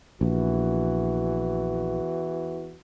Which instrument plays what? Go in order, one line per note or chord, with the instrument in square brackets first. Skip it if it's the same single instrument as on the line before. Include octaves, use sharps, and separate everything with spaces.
[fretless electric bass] A#1 [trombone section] E2 E3 F#4